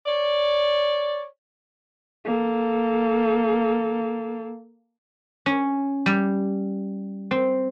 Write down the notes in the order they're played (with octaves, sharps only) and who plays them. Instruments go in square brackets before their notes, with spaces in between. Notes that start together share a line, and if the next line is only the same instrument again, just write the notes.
[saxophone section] C#5 D5
[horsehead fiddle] A#3 A4
[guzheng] C#4
G3
C4